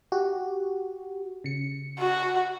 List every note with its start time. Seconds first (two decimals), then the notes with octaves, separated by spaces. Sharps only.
0.12 F#4 G4
1.44 C#3 C#7
1.99 F#4